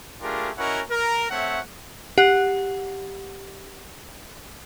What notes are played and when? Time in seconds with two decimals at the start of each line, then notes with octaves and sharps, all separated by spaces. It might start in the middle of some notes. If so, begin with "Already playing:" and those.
0.22 A3 D4 F4 G4 G#4 A#4
0.58 C#4 E4 F#4 A#4 D#5 F#5
0.90 A#4
1.31 A3 C4 C#5 E5 F#5
2.18 G4 F#5